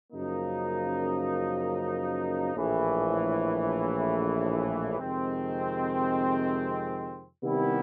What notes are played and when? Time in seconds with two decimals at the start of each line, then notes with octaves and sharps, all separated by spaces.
0.12 F#2 C#3 F3 A#3 D#4
2.56 A#1 A2 E3
4.99 F2 C3 D#3 G#3 C4
7.43 C3 D#3 G3 B3 E4